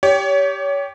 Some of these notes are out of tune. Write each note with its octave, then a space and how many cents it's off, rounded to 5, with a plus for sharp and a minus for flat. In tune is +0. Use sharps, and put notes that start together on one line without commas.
G4 +0 C#5 +30